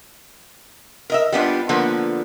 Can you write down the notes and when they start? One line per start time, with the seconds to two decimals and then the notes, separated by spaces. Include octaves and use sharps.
1.10 A#4 D#5 E5
1.32 G3 B3 D4 F4
1.69 D3 F3 A#3 B3